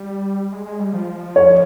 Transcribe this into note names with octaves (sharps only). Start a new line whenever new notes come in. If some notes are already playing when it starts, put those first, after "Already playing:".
Already playing: G3
G#3
G#3
G3
F3
C#5